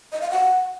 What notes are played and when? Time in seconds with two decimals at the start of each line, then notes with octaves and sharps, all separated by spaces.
0.12 D#5
0.21 F5
0.30 F#5